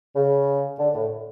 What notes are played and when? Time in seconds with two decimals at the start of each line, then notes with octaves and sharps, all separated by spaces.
0.16 C#3
0.78 D3
0.94 A2